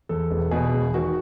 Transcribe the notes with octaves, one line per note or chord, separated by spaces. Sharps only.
E2 A4
E1
B2 G#4
E1
D#3 F#4